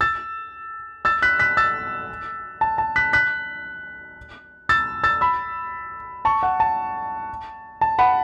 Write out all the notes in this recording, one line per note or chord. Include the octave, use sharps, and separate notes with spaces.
E6 A6
E6 A6
F#6 B6
F#6 B6
E6 A6
A5
A5
F#6 B6
F#6 B6
E6 A6
E6 A6
B5 E6
A5 C#6
F#5
A5
A5
F#5 B5